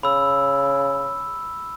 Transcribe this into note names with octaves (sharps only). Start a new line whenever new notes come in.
C#3 B5 E6